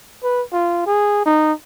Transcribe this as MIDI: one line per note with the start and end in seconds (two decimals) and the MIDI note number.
0.23 0.42 71
0.52 0.81 65
0.86 1.22 68
1.25 1.53 63